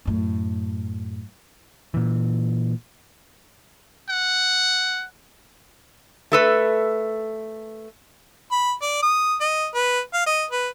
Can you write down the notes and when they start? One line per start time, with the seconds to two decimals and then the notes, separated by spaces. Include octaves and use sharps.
0.06 F#2 A2
1.94 A#2 E3
4.09 F#5
6.32 A3 A4 B4
8.51 B5
8.82 D5
9.02 D#6
9.40 D#5
9.74 B4
10.14 F5
10.26 D#5
10.51 B4